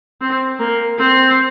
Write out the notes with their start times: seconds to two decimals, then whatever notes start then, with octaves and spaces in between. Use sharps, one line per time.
0.21 C4
0.59 A#3
0.99 C4